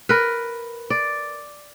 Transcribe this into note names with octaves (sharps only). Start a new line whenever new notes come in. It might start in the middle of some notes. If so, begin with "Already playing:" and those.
A#4 B4
D5